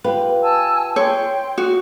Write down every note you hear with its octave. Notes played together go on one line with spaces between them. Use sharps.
F4 G4 B4
G#5 A5 E6
C#5 G5 C6
F#4